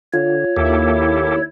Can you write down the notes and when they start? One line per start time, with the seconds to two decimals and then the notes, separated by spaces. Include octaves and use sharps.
0.14 D3 F4 C#5
0.57 D#2 A#3 E4 G4 A4